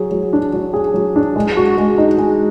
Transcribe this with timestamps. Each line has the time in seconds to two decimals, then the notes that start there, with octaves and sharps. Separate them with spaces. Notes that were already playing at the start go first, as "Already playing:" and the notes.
Already playing: F#3 G#4
0.11 F#3
0.33 D4
0.53 F#3
0.74 G#4
0.94 F#3
1.16 D4
1.36 G#3
1.57 F#4
1.78 G#3
1.98 D#4
2.18 G#3